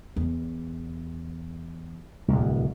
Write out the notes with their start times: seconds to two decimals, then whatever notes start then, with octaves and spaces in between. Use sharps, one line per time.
0.16 E2
2.28 D1 C2